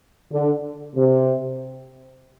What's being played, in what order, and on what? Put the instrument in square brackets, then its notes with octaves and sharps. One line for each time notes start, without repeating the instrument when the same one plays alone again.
[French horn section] D3
C3